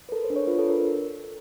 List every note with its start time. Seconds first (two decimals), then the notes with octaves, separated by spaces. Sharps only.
0.09 B4
0.12 A4 A#4
0.24 C5
0.30 D4
0.36 C#5
0.47 F4 B4
0.59 A4
0.64 D4
0.70 A#4